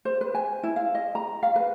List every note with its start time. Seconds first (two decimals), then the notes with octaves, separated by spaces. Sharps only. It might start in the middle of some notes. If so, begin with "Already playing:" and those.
0.05 C5
0.21 B4
0.35 G#5
0.63 E4
0.76 F5
0.95 D#5
1.15 A#5
1.43 F5
1.56 B4